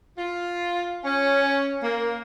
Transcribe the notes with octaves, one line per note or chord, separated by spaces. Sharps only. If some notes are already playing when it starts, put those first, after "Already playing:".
F4
C#4
A#3